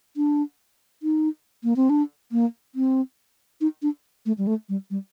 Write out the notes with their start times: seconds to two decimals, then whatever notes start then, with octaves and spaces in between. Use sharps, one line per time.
0.16 D4
1.03 D#4
1.64 A#3
1.76 C4
1.90 D4
2.32 A#3
2.75 C4
3.61 D#4
3.82 D4
4.26 A3
4.38 G3
4.47 A3
4.69 G3
4.90 G3